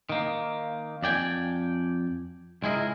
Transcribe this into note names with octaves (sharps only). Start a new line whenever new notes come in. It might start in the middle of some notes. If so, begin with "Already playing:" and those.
D#3 A#3
F2 D5 G5 G#5
C#2 G#3 E4 G#4 A#4